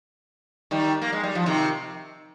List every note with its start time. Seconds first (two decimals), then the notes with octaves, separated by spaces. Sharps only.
0.71 D#3 G3
1.01 A#3
1.13 G#3
1.23 G3
1.35 F3
1.46 C3 D#3